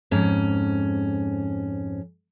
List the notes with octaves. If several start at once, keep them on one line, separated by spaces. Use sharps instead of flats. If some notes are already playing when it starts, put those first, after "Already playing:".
F2 G#2 C#4